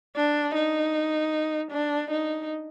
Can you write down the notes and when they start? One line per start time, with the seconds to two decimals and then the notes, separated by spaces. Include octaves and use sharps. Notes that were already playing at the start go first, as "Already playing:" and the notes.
0.16 D4
0.55 D#4
1.72 D4
2.11 D#4